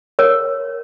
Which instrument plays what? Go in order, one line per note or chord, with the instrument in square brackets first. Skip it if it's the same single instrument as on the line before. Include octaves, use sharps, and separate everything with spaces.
[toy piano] A#4 C#5